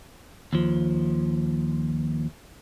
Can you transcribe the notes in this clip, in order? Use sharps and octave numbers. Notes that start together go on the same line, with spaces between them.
D#2 F3